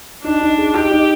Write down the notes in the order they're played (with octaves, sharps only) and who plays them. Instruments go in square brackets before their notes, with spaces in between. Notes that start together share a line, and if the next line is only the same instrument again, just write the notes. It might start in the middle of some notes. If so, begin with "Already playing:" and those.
[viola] D4 [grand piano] D#4
[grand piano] D#4
G#4
[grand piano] D#4 [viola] G4
[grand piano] D#4